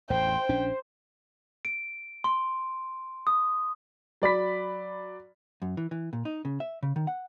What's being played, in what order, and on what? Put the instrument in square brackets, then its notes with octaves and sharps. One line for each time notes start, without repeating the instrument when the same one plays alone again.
[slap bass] A1 E2 A2 [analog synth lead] C5 [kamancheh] G5
[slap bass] A#1 C#4 D4
[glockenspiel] D7
C6
D#6
[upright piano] F#3 D5 B5 B6
[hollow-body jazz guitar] F#2
E3
E3
A#2
D#4
C#3
E5
C#3
D#3
F#5